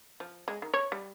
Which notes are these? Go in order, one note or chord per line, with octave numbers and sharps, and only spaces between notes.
F3
G#3
D#3
C#5
G3